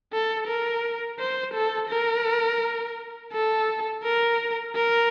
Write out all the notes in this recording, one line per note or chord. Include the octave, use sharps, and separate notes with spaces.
A4
A#4
C5
A4
A#4
A4
A#4
A#4